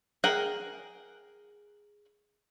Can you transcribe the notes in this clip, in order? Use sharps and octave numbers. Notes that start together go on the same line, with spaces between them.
G#4 A#4 F#5 G5